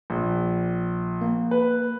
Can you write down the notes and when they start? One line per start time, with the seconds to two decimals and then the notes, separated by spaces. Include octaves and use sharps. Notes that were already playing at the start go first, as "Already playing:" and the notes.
0.10 A#1
1.21 A#3
1.51 B4